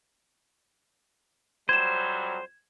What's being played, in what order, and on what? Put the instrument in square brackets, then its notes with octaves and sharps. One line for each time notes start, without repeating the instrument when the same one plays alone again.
[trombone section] F2 F#3 G3 [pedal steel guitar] C5 [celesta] G#6 E7